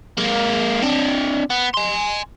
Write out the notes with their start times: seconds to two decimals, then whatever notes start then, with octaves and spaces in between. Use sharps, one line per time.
0.17 G#3 A#3
0.82 C4 D4
1.50 B3
1.74 G#5 C6